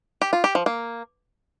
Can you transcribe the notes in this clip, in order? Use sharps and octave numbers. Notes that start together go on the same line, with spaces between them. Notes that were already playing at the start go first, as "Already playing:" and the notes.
G4
F4
G4
F3
A#3